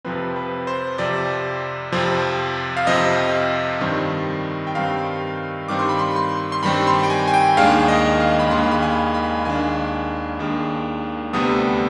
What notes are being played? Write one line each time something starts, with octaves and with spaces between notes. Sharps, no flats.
F2 C3 F3 C4 B4
B4
C5
F2 C3 F3 C4 D5
F2 C3 F3 C4
F5
F2 C3 F3 C4 D#5
G2 D#3 G3 C4
G5
G2 D#3 G3 C4 F5
G2 D#3 G3 C4 D6
C6
B5
C6
C6
C6
G2 D#3 G3 C4 B5
C6
G5
G#5
G#5
G5
D#2 D#3 G#3 D4 F5
D#5
F5
B5
D#2 D#3 G#3 D4 C6
B5
G#5
B5
D#2 D#3 G#3 D4 G#5
D#2 D#3 G#3 D4
D2 C3 G3 B3 D4 D#6